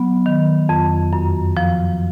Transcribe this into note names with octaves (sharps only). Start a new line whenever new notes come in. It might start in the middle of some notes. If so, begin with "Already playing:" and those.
Already playing: F#3 B3
D#3
F2
F#2
F3